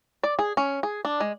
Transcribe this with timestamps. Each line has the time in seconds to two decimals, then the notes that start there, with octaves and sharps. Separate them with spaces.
0.23 D5
0.39 G#4
0.57 C#4
0.83 G#4
1.05 D4
1.20 G#3